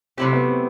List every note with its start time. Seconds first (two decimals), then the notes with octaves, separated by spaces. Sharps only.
0.18 C3 F#3 A3 C4 E4 G4
0.33 B3
0.48 C4